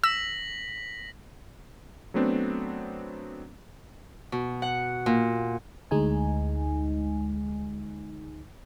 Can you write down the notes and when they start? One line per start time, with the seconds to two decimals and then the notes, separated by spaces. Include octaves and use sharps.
0.04 E6 A#6 B6 F#7
2.14 F#3 A3 B3 C4 D4
4.32 B2
4.62 F#5
5.06 A#2
5.91 D2 G#3 D#4 G#5